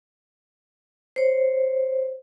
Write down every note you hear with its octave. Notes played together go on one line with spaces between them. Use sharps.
C5 C#5